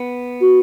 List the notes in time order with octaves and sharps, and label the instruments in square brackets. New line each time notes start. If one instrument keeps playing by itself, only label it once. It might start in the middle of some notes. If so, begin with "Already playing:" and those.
Already playing: [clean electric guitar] B3
[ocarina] F#4